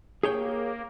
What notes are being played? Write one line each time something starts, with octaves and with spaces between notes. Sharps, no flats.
A#3 G#4 C#5 G5